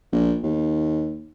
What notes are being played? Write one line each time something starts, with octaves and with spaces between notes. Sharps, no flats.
A#1
D#2